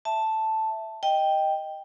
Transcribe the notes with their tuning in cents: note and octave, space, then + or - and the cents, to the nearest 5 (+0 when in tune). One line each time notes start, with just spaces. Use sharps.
E5 +0 A5 +0
D#5 +0 G5 +0